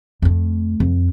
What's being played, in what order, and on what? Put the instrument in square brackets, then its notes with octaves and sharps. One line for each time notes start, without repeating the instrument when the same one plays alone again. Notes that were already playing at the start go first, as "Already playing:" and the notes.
[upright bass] F2 A3
F2